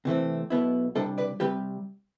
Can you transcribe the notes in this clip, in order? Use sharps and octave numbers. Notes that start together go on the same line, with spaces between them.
C3 E3 A3 C4
B1 B2 B3 E4
C2 C3 G3 D4 A4 C5
B4 D5
C3 G3 G4 B4